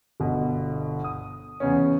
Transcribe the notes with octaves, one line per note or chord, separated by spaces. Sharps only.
G1 B2
D#6
E2 C#3 B3 C#4